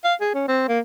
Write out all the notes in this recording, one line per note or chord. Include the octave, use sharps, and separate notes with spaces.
F5
G#4
C#4
C4
A#3